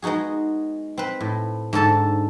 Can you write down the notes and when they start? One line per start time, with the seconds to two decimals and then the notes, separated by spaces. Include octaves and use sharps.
0.02 G#3 B3 D#4 F#4 G#4
0.98 C4 B4
1.21 A2
1.73 G#2 D3 A4 A5